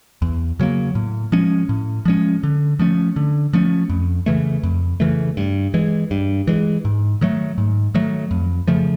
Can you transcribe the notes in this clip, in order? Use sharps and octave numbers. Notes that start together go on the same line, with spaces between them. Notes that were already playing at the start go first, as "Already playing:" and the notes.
E2
C#3 F#3 A#3
A2
F3 G#3 C#4
A2
F3 G#3 C#4
D3
F3 A3 C#4
D3
F3 A3 C#4
F2
C#3 E3 A3
F2
C#3 E3 A3
G2
E3 G#3
G2
E3 G#3
G#2
D#3 F#3 A3
G#2
D#3 F#3 A3
F2
C#3 F3 A3